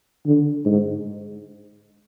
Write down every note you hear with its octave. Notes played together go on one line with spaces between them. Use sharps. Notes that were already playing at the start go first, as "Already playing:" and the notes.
D3
G#2